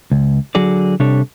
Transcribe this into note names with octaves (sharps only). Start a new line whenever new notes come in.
C#2
D3 F#3 F#4 G#4 D5
C3 G3 D4 A4 C#5